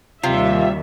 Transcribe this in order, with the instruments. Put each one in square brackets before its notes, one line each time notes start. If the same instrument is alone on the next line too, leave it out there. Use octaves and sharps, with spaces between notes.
[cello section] D#2 G3 [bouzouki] C3 [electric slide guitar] F4 [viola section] E5